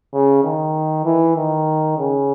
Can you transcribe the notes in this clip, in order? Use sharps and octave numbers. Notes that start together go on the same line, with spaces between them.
C#3
D#3
E3
D#3
C#3